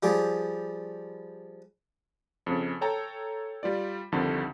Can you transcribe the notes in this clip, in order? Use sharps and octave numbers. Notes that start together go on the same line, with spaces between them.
F3 G3 G#4 D6
F2 C#3
A4 C#5 G5 A5 A#5
G3 F4 D5
C2 F2 D3 D#3 A5